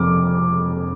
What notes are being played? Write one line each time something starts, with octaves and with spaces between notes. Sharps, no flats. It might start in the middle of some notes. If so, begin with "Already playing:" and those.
Already playing: F1 F2 D6 F6